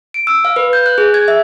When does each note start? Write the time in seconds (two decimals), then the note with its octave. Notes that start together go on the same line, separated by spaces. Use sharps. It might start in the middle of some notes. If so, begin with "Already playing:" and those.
0.14 D7
0.27 E6
0.45 F5
0.56 B4
0.73 G6
0.86 F#6
0.98 G#4
1.14 G#6
1.28 E5